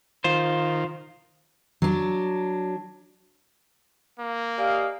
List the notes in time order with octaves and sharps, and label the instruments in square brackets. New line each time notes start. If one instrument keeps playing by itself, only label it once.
[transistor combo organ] D#3 [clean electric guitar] F4 C5
[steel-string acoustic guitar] F#3 D4
[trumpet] A#3
[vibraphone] G4 D5 G#5 [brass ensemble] D#5 F5